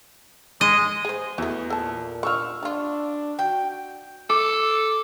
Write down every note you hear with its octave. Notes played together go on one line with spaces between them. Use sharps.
G#3 D#5
G#4 C5
E2 F#3 A3
A#2 A4 A5
D3 F4 C#6 E6 F6
G3 D4 F4
F#4 G5
A4 D6